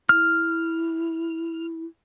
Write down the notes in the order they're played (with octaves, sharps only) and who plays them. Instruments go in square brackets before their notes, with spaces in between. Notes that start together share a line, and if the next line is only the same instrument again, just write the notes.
[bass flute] E4 [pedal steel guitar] F6